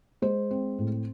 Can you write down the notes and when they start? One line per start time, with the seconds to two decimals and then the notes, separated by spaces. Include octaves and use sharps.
0.22 G#3 C5
0.51 C4
0.78 A2